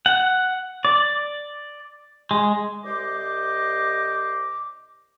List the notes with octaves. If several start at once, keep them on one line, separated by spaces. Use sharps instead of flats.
F#5
D5
G#3
C2 C5 D#5 D6